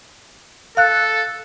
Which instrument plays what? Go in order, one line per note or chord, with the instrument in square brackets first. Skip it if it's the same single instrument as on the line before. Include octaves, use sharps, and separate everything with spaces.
[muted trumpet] A4 [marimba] F5 F#6